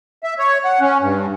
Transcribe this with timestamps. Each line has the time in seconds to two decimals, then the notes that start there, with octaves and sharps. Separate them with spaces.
0.24 E5
0.39 C#5
0.65 F#5
0.81 C#4
1.02 G2